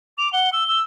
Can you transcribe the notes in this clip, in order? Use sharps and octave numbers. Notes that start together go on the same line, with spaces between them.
D6 F7
F#5 G7
E6 G7
E6